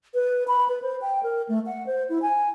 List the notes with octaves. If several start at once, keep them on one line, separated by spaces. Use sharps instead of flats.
B4
B5
B4
C5
G5
A#4
A3
F#5
C5
E4
G#5